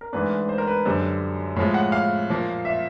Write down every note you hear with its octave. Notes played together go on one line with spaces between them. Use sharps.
A#4
G#2 E3 A3 D4 B4
C5
A#4
B4
F#2 D3 G3 C5
A2 F3 G#3
F#5
F5
A#2 F3 A#3
E5